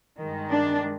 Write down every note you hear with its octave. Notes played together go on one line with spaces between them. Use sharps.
G2 D#3 G#3
D4